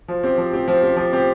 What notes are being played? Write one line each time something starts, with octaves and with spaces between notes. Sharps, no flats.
F3
C4 G4
F3
C4 G4
F3
C4 G4
F3
C4 G4